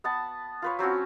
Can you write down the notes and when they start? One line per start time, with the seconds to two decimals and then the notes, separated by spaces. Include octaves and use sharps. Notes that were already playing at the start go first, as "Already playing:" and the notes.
0.04 B3 F#5 A5
0.62 F4 B4 C#5
0.79 F#3 C4 C#4 F#4